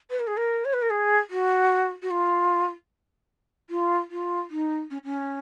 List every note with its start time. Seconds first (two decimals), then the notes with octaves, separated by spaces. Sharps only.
0.10 B4
0.19 A#4
0.27 G#4
0.37 A#4
0.65 C#5
0.73 B4
0.82 A#4
0.90 G#4
1.30 F#4
2.02 F#4
2.11 F4
3.70 F4
4.11 F4
4.50 D#4
4.91 C#4
5.05 C#4